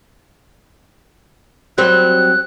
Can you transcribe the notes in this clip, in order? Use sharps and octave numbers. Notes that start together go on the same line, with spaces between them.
F#3 G3 C4 F#6